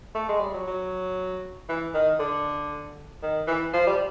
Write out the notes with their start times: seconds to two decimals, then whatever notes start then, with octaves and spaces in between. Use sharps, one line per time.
0.15 A3
0.28 G#3
0.40 G3
0.54 F#3
0.67 F#3
1.69 E3
1.94 D#3
2.19 D3
3.22 D#3
3.47 E3
3.73 F3
3.87 G3